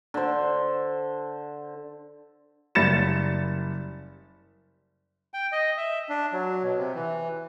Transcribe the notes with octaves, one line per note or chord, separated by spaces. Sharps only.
D3 C5
F#1 G3 B5 A6 C#7 E7
G5
D#5
E5
D4
F#3
B2
C3
E3